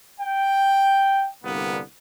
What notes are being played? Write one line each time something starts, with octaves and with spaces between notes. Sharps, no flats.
G5
C2 G2 D3 A#3 B3